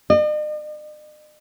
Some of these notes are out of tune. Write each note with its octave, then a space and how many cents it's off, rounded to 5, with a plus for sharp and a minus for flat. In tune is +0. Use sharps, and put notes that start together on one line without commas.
D#5 -45